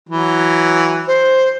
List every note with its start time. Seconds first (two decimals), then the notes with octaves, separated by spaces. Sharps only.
0.09 E3 F#3
1.07 C5